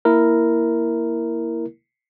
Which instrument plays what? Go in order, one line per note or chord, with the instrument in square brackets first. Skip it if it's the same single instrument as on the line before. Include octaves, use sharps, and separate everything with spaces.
[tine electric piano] A#3 E4 A#4